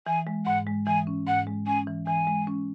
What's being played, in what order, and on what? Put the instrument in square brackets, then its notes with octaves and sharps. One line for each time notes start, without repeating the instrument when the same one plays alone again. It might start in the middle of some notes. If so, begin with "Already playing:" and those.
[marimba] E3 [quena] G#5
[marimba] G#3
[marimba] G#2 [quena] F#5
[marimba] G#3
[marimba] E3 [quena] G#5
[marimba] C#4
[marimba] G#2 [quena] F#5
[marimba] G#3
[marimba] C#4 [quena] G#5
[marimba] E3
[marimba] E3 [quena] G#5
[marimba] G#3
C#4